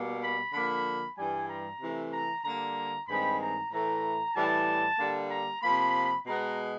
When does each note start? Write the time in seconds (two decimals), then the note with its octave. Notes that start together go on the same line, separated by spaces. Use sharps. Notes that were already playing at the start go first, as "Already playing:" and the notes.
Already playing: B2 G3 A#3
0.21 B5
0.53 D3 F3 A#3 B5
1.17 G2 E3 G3 G#5
1.49 A#5
1.80 C3 E3 A3
2.12 A#5
2.44 D3 G3 A#3 A#5
3.08 G2 D#3 G#3 C4 B5
3.39 A#5
3.71 A2 E3 A3 A#5
4.34 A2 E3 G3 A5
4.98 D3 G3 A#3
5.31 A#5
5.63 C3 F3 A#3 B5
6.26 B2 G#3 B3 A#5